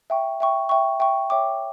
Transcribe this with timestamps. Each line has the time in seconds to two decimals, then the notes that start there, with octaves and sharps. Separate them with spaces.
0.10 E5 G5 C#6
0.40 E5 G5 C#6
0.69 E5 G5 C#6
1.00 E5 G5 C#6
1.30 C#5 E5 G5 D6